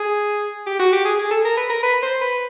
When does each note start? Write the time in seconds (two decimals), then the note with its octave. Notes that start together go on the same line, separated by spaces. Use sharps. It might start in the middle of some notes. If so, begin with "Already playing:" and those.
Already playing: G#4
0.67 G4
0.79 F#4
0.93 G4
1.05 G#4
1.19 G#4
1.31 A4
1.45 A#4
1.57 B4
1.70 A#4
1.83 B4
2.02 C5
2.21 B4